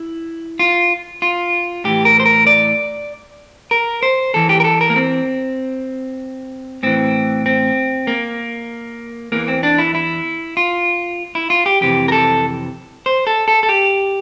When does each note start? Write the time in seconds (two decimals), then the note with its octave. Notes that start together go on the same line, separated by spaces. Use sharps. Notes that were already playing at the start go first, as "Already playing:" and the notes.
Already playing: E4
0.59 F4
1.22 F4
1.85 A2 E3 G4
2.05 A#4
2.20 C5
2.26 A#4
2.47 D5
3.71 A#4
4.03 C5
4.34 E2 E3 A4
4.49 G4
4.60 A#4
4.64 A4
4.81 A#4
4.90 A#3
4.96 C4
6.83 A2 E3 C4
7.46 C4
8.07 A#3
9.32 E2 E3 A#3
9.48 C4
9.63 D4
9.78 E4
9.95 E4
10.57 F4
11.35 E4
11.50 F4
11.66 G4
11.81 F2 C3 E3 G4
12.08 A#4
12.12 A4
13.06 C5
13.27 A4
13.48 A4
13.63 A4
13.69 G4